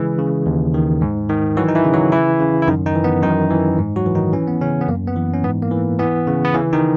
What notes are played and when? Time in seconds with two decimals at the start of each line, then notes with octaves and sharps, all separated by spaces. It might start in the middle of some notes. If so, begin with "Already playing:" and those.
Already playing: C#3 E3 G#3 G#4
0.19 C#3
0.46 D#2
0.74 D#3
1.02 G#2
1.29 D#3
1.57 E3 F#3 F#4
1.69 D#4
1.75 E3 E4
1.85 C#3
1.94 F#3 F#4
2.12 E3 E4
2.40 C#3
2.62 E4
2.67 F#2 D#3 D#4
2.86 D#3 D#4
2.95 E3
3.04 B3
3.23 F#2 D#3 D#4
3.50 E3
3.78 G#2
3.96 F#3 F#4
4.06 E3
4.15 D#3 D#4
4.33 E3 C#4
4.48 B3
4.61 C#3 C#4
4.81 B3
4.88 F#2 A#3
5.07 B3
5.16 E3
5.34 C#4
5.44 G#2 B3
5.62 A#3
5.72 E3
5.99 E3 B3
6.27 C#3
6.45 B3
6.54 C#3 E3 C#4
6.73 D#3 D#4